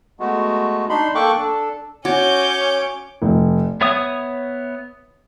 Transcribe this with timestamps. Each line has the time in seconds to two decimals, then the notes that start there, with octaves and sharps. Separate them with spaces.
0.20 G#3 A3 B3 F#4
0.89 D4 D#4 B5 C6
1.15 A#3 A4 G5 C#6 D6 F#6
1.38 D4 A4
2.05 C#4 F#4 C#5 D6 G6
3.22 F1
3.81 B3 C#5 E5 D#6